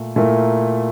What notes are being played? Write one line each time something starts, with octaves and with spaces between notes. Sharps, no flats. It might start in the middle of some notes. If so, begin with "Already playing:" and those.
Already playing: A#2 A3 A#4
A#2 A3 E4 A#4